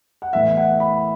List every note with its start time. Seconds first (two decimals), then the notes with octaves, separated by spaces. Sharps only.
0.22 F#5
0.33 A2 E3 B3 E5
0.57 F#5
0.80 B5